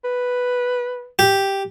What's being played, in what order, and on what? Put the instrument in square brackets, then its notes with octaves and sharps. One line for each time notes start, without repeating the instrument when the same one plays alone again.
[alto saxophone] B4
[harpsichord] G4